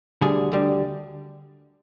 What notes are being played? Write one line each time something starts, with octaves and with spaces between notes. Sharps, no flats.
D2 D3 G3 G#4
D2 D3 G3